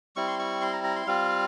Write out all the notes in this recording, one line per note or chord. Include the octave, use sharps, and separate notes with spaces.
G3 C4 E4 C#6
C6
C#6
C6
A#5
A#5
C6
G3 C4 F4 F5